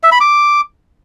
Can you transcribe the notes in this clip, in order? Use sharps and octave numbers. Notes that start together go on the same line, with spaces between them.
E5
B5
D6